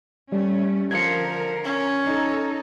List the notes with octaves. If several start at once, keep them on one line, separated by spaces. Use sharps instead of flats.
G3 A3 C#4
D3 F3 A#4 G#6 C#7
C#4
D#4 A4